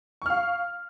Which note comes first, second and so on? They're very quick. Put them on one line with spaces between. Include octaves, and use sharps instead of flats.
C#6 F6 F5